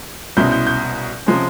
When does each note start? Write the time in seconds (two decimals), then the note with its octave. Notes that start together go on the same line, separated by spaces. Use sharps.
0.37 C2 B2 G#3 C#4 E4 G6
0.52 G6
0.67 G6
1.26 C3 F3 G#3 C#4